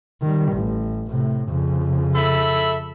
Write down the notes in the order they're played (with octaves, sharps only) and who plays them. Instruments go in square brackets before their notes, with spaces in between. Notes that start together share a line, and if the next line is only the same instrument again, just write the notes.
[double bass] D#3 G3
A1
A2 C3
F2 C#3
[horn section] A4 E5 B5